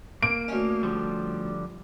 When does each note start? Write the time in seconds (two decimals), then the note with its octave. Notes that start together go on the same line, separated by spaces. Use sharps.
0.23 A#3 D7
0.48 D2 C#4
0.83 D3 F3 G3